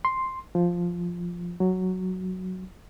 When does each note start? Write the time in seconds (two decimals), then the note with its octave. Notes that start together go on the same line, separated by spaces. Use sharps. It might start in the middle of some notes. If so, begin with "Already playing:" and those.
0.05 C6
0.55 F3
1.60 F#3